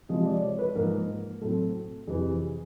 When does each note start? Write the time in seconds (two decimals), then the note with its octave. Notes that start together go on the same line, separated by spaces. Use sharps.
0.09 C3 F3 G#3 C4 D#5
0.26 D5
0.42 C#5
0.59 B4
0.75 G#2 F3 A#3 A#4
1.41 A2 F#3 A3 C4 A4
2.07 F2 C3 E3 G#4